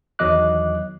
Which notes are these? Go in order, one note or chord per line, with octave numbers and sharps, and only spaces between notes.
E2 D#3 F#3 D#5 D6 F#6